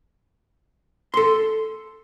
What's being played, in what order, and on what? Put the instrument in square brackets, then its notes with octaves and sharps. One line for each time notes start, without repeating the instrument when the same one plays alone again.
[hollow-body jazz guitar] A4 C6